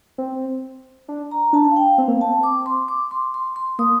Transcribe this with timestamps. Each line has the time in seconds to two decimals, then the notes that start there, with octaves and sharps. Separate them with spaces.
0.18 C4
1.08 D4
1.31 A#5
1.53 D4 A5
1.71 F5
1.76 G5
1.98 C4 F5
2.08 A#3
2.17 C4 A5
2.43 D6
2.66 C6
2.88 D6
3.11 C6
3.34 C6
3.56 C6
3.79 A#3 D#6